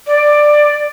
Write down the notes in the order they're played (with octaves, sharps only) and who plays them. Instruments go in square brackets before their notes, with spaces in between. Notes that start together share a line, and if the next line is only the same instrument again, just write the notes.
[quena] D5